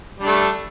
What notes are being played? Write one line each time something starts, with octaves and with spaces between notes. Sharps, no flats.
G3 A3 D4